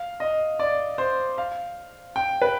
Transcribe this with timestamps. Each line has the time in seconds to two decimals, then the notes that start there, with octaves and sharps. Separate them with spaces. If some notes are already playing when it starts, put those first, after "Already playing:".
Already playing: F5
0.20 D#5
0.59 D5
0.98 C5
1.38 F5
2.16 G5
2.42 B4